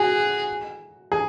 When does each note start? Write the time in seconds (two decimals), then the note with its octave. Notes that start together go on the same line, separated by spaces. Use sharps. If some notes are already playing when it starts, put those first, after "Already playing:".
Already playing: F#4 G#4
1.12 G#4